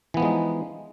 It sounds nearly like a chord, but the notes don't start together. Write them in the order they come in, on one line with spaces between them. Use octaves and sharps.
E3 B3 F3 G#3 D#4